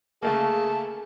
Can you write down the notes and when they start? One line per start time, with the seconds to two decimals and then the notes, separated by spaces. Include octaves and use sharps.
0.23 C#3 A3 A#3 G#4 A5